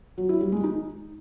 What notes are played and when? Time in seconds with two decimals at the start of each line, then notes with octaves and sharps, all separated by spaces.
0.18 F#3
0.29 E4
0.41 G3
0.52 G#3
0.64 D#4